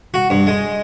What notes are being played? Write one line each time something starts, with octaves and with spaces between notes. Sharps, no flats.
F#4
G2
G#3